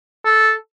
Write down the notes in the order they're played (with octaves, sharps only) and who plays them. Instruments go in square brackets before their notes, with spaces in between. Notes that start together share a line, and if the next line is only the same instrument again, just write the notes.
[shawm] A4